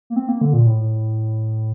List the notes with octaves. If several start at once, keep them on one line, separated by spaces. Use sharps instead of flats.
A#3
C4
A#3
D3
A#2
A2